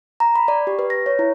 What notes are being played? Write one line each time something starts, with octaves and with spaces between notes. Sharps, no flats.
A#5
B5
D5
G4
B4
A#6
C#5
E4